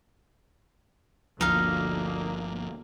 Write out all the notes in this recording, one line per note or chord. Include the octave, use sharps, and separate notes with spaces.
G1 D2 F3 A#3 D#4 F5